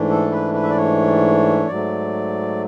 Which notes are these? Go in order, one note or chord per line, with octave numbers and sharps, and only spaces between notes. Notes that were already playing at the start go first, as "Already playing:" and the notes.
Already playing: G#2 E3 A3 D4
A4
B4
B4
E5
D5
C#5
G#2 F#3 A3 D5